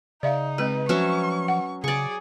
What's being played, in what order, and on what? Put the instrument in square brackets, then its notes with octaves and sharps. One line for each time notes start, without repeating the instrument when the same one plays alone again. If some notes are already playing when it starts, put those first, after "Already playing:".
[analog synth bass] C#3 [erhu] D#4 [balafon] D5 E5 F5
[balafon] G#3 C4 [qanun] B4
[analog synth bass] F3 [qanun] F#3 C#4 E5 [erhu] C#6
[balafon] F#5
[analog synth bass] C#3 [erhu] G#4 [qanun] D5 C#6